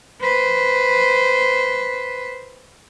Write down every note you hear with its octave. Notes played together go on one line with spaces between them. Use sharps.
B4 C5